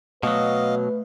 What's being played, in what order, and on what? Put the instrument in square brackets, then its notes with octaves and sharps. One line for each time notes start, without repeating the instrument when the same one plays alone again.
[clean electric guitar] B2 F#3 [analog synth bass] A3 [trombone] B4 [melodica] D#5 F5